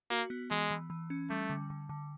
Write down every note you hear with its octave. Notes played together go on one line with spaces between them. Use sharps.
A#3 F#4
B3
E3 G#3
E3
E3
C#4
G3 A3
D3
D3
D3